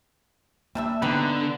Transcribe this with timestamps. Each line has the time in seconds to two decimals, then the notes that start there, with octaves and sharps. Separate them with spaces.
0.75 G3 A#3 D4 E5
1.02 D3 B3 D#4 G4 B4